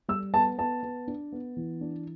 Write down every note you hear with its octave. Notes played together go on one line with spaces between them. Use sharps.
G3 E6
B3 A5
B3 A5
B3
D4
B3
E3
D4